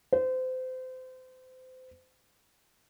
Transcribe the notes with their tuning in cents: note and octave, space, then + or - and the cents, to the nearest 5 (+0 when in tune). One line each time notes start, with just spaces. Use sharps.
C5 -30